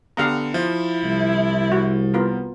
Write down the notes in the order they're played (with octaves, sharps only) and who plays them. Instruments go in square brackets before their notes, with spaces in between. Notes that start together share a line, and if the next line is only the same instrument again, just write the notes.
[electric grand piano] D3 B3 [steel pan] G4 F5 A#5
[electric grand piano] F3 [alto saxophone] E4
[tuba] C2
[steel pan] F#4
B3 F4 A#4